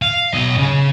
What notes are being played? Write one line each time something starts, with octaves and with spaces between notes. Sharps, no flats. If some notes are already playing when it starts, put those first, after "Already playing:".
F5
B1 D#5
C#3